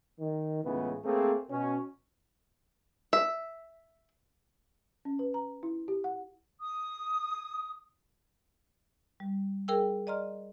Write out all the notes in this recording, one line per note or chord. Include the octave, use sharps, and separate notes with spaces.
D#3
C#2 A2 C#3 E3 B3
A3 A#3 C4 G#4
B2 C#4
E5
C#4
B4
A#5
E4
G4
F#5
D#6
G3
G#4 A#4 G5 E6
D5 D#5 A#5 C6 F6